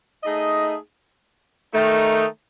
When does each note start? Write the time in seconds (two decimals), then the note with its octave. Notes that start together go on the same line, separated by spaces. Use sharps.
0.22 A3 D#4 G#4 D#5
1.73 D#3 A3 D#4